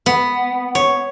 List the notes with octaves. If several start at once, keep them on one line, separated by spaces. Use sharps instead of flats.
B3
C#5